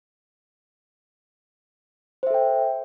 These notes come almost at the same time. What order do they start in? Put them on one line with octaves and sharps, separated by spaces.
C5 E5 A4 G5